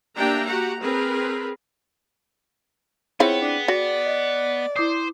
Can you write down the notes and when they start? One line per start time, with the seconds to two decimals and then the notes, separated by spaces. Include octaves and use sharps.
0.16 A#3 D4 G4 E5 G5 A#5
0.46 F#4 G4 F#5 A#5
0.81 C4 G#4 A#4 B4
3.20 B3 C4 E4 F4 G#4 C#5 G5
3.41 D4
3.68 F#4 D5
4.06 D#5
4.76 E4 C5 D6 D#6